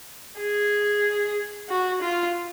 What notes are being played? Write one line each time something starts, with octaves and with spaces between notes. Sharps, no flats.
G#4
F#4
F4